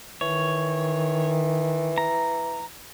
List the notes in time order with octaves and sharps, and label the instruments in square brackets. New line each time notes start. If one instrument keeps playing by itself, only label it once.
[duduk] D#3 [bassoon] E3 [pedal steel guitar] C#5
[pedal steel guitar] A#5